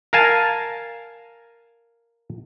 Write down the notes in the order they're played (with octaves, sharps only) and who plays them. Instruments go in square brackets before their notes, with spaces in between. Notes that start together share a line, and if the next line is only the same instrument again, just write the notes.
[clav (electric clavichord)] A#4 F5 G#5 A5